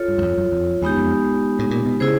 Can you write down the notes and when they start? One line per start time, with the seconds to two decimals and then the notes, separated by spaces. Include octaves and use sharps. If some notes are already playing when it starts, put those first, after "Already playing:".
Already playing: F4 A4 C#5
0.08 G2
0.18 F#2
0.22 F2
0.37 F#2
0.52 F2
0.82 E2 G#3 B3 D#4 G4
0.97 F2
1.59 A2
1.71 A#2
1.86 B2
2.00 C#3 E4 G#4 C5